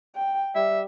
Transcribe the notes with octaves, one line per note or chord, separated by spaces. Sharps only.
G5
G3 E5